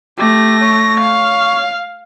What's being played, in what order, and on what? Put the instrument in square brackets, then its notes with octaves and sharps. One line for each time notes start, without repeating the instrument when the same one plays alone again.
[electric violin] A3 A#6 [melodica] G4
[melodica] C#5
[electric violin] F5